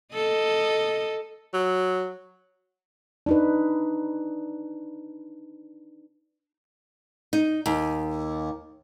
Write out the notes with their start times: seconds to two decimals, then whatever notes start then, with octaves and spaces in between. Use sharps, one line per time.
0.14 A4 D#5
1.54 F#3
3.26 D4 D#4 B4
7.33 D#4
7.66 D#2